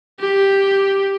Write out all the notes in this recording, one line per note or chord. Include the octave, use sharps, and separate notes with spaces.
G4